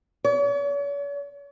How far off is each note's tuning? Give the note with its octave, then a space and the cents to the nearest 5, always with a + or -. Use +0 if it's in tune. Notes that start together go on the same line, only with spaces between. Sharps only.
C#5 +45